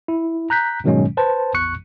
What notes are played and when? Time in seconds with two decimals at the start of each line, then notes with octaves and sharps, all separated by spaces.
0.08 E4
0.50 A#5 F#6 G6 B6
0.84 G#2 B2 D#3 F#3 G#3 C#4
1.17 B4 C5 A5
1.54 A1 E2 C#6 F#6 C#7